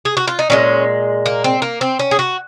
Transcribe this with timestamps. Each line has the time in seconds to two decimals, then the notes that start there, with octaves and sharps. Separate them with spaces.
0.05 G#4
0.17 F#4
0.27 F4
0.39 D#4
0.50 A#2 F3 G#3 C#4
1.26 A#3
1.44 C4
1.62 A#3
1.81 C4
1.99 C#4
2.11 G#4
2.19 F#4